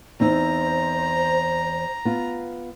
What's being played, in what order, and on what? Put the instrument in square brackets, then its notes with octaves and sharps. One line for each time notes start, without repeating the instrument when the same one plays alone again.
[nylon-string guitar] E2 C4 D#4 [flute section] C5 [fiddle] A#5
[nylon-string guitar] B3 F4